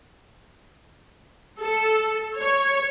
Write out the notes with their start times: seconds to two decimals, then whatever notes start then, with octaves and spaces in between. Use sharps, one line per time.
1.61 A4
2.38 C#5